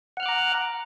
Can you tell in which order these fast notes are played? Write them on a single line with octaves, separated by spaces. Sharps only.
F#5 F6 F#6 D6 A#5